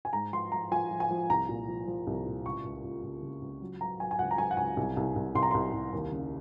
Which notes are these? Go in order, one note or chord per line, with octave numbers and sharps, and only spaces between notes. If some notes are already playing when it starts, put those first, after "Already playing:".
G#5
G#2 A#5
F3 C6
F3 A#5
F3 G#5
F3
G#5
F3
C2 A#5
A#2
F3
F3
C2
A#2
C#2 C#6
C#2
C#2
C#2
C#3
C#2
F#3
F#3 A#5
F#3 G#5
G#5
C#2 F#5
A#5
F#3 G#5
F#5
C#2 G#5
C2
C2
C2
C2 C6
A#5
C2 C6
C2
D#2
C#3